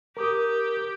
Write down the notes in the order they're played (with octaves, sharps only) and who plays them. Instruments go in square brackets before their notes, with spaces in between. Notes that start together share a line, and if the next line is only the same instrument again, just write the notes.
[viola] G4 [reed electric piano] A#4 D6 D#6